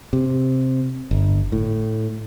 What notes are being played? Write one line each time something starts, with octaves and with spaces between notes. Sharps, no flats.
C3
G1
A2